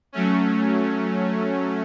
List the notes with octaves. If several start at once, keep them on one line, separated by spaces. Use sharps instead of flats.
F#3 A3 C#4